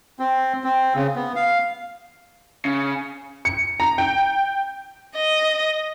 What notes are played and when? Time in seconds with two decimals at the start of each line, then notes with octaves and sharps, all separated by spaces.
0.19 C4
0.64 C4
0.95 C#3
1.16 B3
1.36 F5
2.65 C#3
3.45 C#7
3.80 A#5
3.98 G5
5.16 D#5